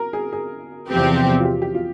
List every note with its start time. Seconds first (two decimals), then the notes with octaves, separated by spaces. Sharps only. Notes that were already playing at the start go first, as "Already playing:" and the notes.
Already playing: A#4
0.13 G#4
0.32 G#4
0.89 E2 C3 F3 C4 G4
1.40 F4
1.45 G4
1.62 G4
1.75 F4